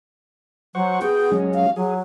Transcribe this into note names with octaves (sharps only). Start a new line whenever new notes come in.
F#3 C5 F#5 C#6
B3 F#4 G#4 G5
F#3 G#3 C#4
F5
F#3 G#4